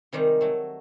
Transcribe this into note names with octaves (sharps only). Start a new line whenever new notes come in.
C3 D#3 G3 G#3 A#5
F#3 A3